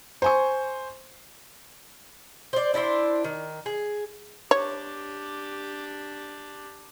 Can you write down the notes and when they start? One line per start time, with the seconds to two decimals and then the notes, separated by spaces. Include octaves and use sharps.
0.22 C5 G#5 C#6
2.53 C5 D5
2.74 D4 E4 A#4 C5
3.24 D#3
3.66 G#4
4.51 D4 G4 C#5